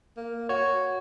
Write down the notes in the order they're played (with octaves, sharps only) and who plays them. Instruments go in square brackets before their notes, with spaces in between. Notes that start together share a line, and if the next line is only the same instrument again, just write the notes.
[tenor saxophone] A#3
[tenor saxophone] F#4 [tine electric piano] C#5